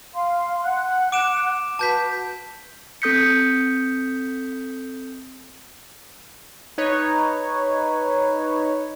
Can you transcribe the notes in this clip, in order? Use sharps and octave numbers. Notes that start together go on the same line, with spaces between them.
F5 C6
F#5 F#6
D6 D7 E7
F#4 B4 A5 G6 B6
C4 A4 D#6 G6 B6 C#7
D#4 B4 C#5